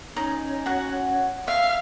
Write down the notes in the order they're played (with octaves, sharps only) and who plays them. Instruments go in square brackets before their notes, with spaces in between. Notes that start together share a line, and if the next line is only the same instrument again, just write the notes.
[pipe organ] C#4 C#5 [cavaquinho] D#4
[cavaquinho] F#4 F#5
[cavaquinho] E5 [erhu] F5